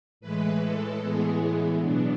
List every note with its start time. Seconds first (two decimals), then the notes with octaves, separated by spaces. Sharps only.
0.21 A2 E3 G#3 B4
0.61 A4
1.01 A2 E3 G#3 B3 G#4
1.82 B2 F#3 B3 D4